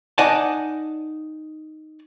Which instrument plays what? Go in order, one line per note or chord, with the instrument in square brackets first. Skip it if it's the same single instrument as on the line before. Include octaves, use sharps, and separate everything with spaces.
[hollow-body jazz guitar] D#4 D5 D#5 F#5 G#5 A5